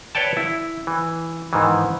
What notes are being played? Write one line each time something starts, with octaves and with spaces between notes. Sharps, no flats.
B4 C#5 D5 G5 A5
E4
E3
G#2 D#3 E3